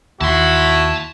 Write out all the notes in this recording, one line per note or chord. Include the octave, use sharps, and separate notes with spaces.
D#2 E4 F#4 A5 C6